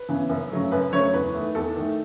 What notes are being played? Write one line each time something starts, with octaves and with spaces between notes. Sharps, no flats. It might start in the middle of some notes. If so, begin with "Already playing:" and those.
Already playing: B4
C#3 E3 B3
F#2
C#3 F#3 A3
F#2 B4
C#3 F#3 A3 C#5
E2 B4
D#3 A3
E2 A4
D#3 A3